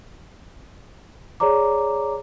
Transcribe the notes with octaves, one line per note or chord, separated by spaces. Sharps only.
G#4 C#5 D5 A#5 D6